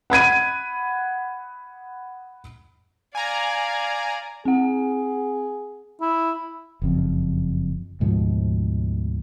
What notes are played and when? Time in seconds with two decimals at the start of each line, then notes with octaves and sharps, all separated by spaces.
0.10 F#5 B5 G#6 D#7
3.15 D5 F5 G#5 A#5
4.45 C4 G#4 F#5
6.01 E4
6.82 F#1 F2
8.00 D2 G#2 B2 F3